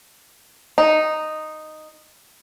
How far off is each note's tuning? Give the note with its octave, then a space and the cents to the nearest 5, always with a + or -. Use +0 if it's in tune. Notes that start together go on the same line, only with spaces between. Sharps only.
D#4 -5